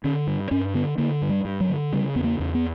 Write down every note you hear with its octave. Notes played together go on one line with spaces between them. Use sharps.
D3 C#4
G2
G2 C#4
D3 B3
D3 A#3
G2
G3
G2
F#3
D3
C#3 G3
E2 B3
A#3
E2
B3